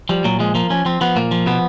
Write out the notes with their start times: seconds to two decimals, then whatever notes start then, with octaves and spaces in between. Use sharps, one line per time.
0.09 F3 G3
0.24 A#2 F#3
0.39 F3 G#3
0.55 F3 A#3
0.70 F3 C#4
0.85 F3 C4
1.01 F3 B3
1.16 A#2 A#3
1.31 F3
1.46 B2 B3